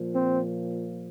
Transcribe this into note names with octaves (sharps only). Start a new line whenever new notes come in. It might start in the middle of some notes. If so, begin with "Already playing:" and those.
Already playing: A#2 F3
C4